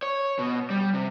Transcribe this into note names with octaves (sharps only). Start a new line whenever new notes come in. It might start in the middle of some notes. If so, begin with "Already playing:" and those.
C#5
B2
G3
C3